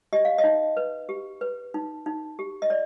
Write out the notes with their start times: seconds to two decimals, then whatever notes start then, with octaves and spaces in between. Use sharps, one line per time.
0.13 G4 D#5
0.25 F5
0.38 D#5
0.44 D#4
0.77 B4
1.09 G4
1.41 B4
1.74 D#4
2.06 D#4
2.39 G4
2.62 D#5
2.70 D5